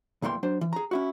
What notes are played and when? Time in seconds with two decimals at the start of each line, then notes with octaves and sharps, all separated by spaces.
0.22 B1 E2 A#2 E3 G3 C6
0.43 F#3 D4 C5
0.61 E3
0.73 G#4 A#5
0.91 C#4 E4 F#4